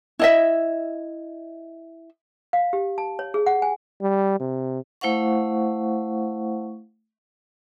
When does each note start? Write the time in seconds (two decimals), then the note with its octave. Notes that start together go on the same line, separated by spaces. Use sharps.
0.19 E4 D#5 E5
2.53 F5
2.73 G4
2.98 A5
3.19 C#5
3.34 G#4
3.46 F#5
3.62 G#5
4.01 G3
4.40 C3
5.01 A3 E4 C5 F5 F#5 C#6